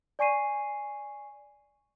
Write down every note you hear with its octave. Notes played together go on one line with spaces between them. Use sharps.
D5 G#5 C#6 C7 D#7